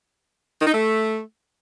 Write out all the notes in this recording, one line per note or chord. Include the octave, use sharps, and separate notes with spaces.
D#3
D#4
A3